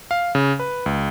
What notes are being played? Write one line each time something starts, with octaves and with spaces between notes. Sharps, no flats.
F5
C#3
B4
C#2